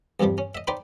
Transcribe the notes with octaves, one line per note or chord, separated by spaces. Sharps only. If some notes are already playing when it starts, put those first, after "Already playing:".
E2 G2 C3 F3 G3
C#4
D#5 E5
D#4 C5 D5 G5 B5